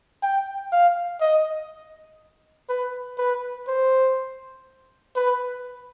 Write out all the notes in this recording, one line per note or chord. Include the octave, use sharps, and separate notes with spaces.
G5
F5
D#5
B4
B4
C5
B4